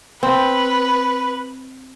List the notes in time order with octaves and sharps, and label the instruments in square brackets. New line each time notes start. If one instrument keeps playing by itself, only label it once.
[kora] C4 [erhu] B4